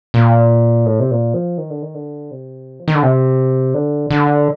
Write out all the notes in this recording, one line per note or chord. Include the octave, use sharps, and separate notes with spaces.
A#2
A2
C3
A#2
F3
D#3
D3
D#3
D3
C3
F3
D#3
D3
C3
D3
D3